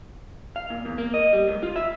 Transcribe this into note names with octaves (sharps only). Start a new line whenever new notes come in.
F5
A#2
E2
A#3
D#5
G3
C#2
F4
E5